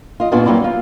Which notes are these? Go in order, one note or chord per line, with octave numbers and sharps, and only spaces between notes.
F4 D#5
A#2 B3 D4 F4 F#4 D5
F#3 G3 A#3 D4 E4 D5
F4